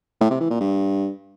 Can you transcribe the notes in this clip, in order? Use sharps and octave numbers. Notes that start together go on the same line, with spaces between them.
A2
C3
E3
A#2
G2